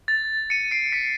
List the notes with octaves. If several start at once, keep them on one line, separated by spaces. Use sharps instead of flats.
A6
C#7 D#7
C7 D7
B6 C#7